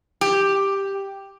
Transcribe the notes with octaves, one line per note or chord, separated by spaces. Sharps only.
G4